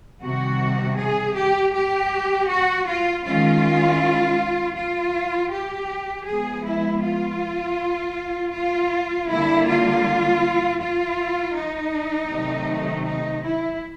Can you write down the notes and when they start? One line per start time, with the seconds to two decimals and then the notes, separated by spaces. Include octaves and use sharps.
0.22 C3 D#3 G3 F#4
0.97 G#4
1.36 G4
1.73 G4
2.49 F#4
2.86 F4
3.24 D#3 G#3 C#4 F4
4.75 F4
5.51 G4
6.26 F3 G#3 B3 G#4
6.65 E4
7.02 F4
8.53 F4
9.28 D3 G3 A#3 E4
9.66 F4
10.80 F4
11.55 D#4
12.30 C3 D#3 F#3 A3
13.06 D#4
13.44 E4